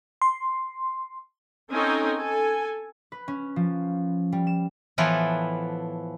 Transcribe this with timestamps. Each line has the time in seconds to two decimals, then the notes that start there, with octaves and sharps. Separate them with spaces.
0.22 C6
1.70 C4 C#4 D#4 A4 D#5 G#5
2.16 A4 G#5
3.12 B4
3.28 C#4
3.56 F3
4.32 G3
4.47 E7
4.98 A2 E3 F3 B3 E4 A4